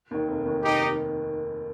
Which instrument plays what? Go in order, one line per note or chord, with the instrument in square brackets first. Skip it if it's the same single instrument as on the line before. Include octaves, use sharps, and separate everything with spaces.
[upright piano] D#2 D#3
F1
D#2 D#3
[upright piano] F1 [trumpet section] D#4 G4
[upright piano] D#3